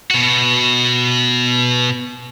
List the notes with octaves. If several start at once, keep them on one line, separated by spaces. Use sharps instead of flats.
B2 F#4